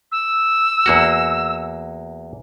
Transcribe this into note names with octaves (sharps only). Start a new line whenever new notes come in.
E6
E2 A#3 F#4